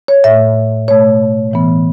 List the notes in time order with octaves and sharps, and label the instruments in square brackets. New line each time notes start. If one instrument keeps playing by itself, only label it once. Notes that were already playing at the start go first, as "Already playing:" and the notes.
[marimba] C#5
A2 A3 E5
B2 A3 C#5
A2 E3 B3